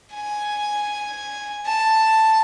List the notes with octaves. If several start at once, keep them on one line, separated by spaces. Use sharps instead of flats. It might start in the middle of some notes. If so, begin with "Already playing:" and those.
G#5
A5